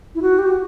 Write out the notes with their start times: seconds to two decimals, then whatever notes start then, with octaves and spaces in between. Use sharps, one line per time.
0.15 E4
0.22 F#4
0.38 G4
0.47 F#4